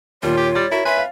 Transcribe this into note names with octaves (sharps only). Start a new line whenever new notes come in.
D#2 A#2 G3 F4 C#5
G4
G3 A6
E4 F#4 A#4
B4 E5 G#5 C6
F5